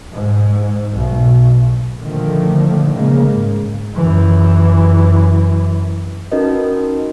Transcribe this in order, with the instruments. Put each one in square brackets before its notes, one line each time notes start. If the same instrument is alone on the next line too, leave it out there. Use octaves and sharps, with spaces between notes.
[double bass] G#2
B1 B2
[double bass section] A#2 D3 D#3 F3 A3
C#3 G#3 A#3
G#2
[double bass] F#2 E3
[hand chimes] C#4 D#4 F#4 A#4 B4 D#5